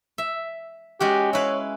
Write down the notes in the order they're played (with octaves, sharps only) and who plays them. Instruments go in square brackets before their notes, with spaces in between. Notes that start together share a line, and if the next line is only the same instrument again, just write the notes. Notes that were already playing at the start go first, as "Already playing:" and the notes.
[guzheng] E5
[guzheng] G#3 C#4 F#4 [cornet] G4
[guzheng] E4 B4 F5 [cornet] C#5